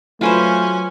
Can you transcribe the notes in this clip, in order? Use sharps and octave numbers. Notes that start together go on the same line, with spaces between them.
F#3 A3 C#4 F4 B4 C5 G#5